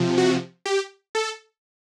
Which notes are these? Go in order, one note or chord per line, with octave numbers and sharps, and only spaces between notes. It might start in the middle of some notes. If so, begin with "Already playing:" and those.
Already playing: C3 F3
F#4
G4
A4